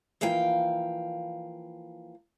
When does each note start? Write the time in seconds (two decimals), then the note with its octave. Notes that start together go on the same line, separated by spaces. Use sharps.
0.21 E3 F3 A#3 F5 G5